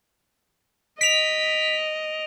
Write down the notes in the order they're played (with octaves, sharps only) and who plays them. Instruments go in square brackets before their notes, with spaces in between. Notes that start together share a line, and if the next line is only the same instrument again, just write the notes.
[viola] D#5 [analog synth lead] B6 [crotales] D7 F7